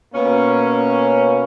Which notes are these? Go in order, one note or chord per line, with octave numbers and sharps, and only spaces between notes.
B2 A#3 C#4